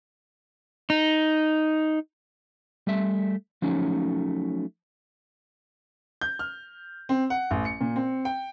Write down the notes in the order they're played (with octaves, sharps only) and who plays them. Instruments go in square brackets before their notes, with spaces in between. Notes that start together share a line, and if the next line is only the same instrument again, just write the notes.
[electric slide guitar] D#4
G3 A3 E5
F3 F#3 A3 C#4 D#4
[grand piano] G6
F6
C4
F#5
A1
C#7
A#2
C4
G5